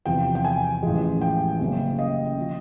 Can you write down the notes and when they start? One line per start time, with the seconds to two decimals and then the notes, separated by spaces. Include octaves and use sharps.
0.06 E2 C3 F3 G5
0.35 G5
0.44 G#5
0.83 A1 A2 F3 G#3
1.21 G5
1.60 F#1 F#2 C#3
1.99 D#5
2.40 F3